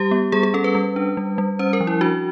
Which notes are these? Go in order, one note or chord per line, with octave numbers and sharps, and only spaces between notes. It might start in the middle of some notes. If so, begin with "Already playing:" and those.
Already playing: G3 G4
B3
G3 G#4
G#4
C#4 A4
B4
G3
D4
G3
G3
C#4 C5
A#4
F3
E4
D4 F#4